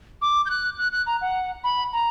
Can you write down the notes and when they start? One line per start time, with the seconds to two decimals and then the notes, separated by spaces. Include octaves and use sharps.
0.22 D6
0.46 G6
0.50 F#6
0.78 F#6
0.92 F#6
1.07 A#5
1.21 F#5
1.64 B5
1.93 A#5